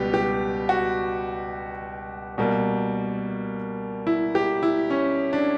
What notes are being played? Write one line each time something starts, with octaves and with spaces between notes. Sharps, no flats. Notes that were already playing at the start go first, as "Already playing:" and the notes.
Already playing: C#2 B2 G3 B3 G4 B4
G4
F#4
B2 G3 A#3
E4
G4
E4
C#4
D4